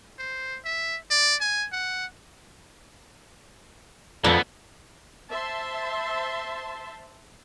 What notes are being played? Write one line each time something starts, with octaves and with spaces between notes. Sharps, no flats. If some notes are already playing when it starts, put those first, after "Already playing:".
C5
E5
D5
G#5
F#5
F2 D3 B3
C5 E5 A5 C6